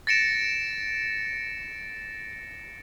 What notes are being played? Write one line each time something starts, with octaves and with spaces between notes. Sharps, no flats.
A6 A#6 C#7 D7 E7